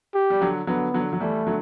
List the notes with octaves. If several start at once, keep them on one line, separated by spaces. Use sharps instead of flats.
G4
G3
D3 F#3
D3 F#3 B3
D3 F#3
F#3
E3 G3 A3
D3 F#3